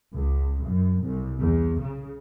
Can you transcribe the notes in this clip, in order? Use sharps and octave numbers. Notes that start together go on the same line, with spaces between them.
C#2
F#2
C2
E2
C#3